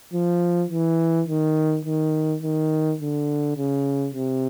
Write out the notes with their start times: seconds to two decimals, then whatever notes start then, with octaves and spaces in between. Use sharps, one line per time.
0.13 F3
0.70 E3
1.28 D#3
1.85 D#3
2.43 D#3
3.01 D3
3.57 C#3
4.15 C3